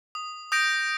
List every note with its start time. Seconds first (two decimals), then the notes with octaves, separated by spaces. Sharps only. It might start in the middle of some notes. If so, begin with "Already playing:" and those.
0.15 D#6
0.52 D#6 G6 A#6 D7